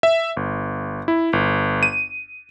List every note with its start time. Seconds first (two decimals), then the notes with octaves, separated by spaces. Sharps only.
0.03 E5
0.37 G1
1.08 E4
1.33 G1
1.83 D#7